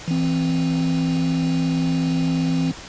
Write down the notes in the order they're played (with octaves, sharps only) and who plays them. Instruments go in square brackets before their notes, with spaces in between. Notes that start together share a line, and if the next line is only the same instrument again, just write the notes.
[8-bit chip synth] E3 C4